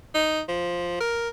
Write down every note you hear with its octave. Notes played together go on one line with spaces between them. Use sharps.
D#4
F3
A#4